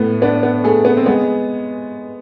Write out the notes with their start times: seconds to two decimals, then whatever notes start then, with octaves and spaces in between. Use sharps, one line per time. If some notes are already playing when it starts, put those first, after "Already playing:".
Already playing: A2 A3 B3
0.22 B3 D4
0.43 B3
0.64 A3 G#4
0.85 B3
0.97 C4
1.06 G#3 B3